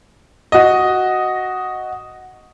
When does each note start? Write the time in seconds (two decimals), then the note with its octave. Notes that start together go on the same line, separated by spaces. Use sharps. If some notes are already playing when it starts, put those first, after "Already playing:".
0.52 F#4 D#5